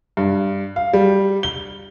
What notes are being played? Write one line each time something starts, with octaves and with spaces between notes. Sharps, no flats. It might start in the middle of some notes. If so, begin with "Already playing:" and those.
G2
F5
G3
G7